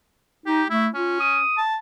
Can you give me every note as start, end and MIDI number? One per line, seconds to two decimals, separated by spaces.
0.46 0.63 63
0.46 0.67 67
0.70 0.88 57
0.70 0.87 64
0.94 1.40 61
0.94 1.16 65
1.20 1.58 87
1.57 1.76 81